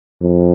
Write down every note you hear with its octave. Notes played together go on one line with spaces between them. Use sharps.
F2